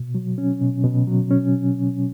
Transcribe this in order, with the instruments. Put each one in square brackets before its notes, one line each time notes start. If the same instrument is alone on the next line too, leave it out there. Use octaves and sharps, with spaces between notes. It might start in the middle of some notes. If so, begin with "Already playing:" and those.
Already playing: [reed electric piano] B2
F#3
C#4
B2
B2
F#3
C#4